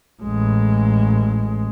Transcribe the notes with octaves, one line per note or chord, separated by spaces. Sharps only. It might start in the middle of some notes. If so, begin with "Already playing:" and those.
A1 G#3